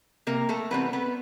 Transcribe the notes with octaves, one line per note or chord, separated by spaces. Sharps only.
C3 A#3 A#4
A3 A4
E3 G3 B3 C4 B4
B3 B4